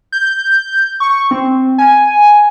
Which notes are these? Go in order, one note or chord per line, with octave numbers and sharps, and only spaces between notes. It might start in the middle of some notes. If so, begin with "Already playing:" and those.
G6
C#6
C4
G#5